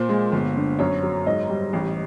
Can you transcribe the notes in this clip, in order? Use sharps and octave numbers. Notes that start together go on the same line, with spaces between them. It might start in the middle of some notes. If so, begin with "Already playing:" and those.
Already playing: A#2 C5
G#3
G1
D3
F#2 C#5
F#3
G#2 D#5
G3
A1